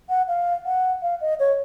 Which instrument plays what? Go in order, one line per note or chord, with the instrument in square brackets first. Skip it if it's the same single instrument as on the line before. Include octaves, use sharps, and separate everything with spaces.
[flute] F#5
F5
F#5
F5
D#5
C#5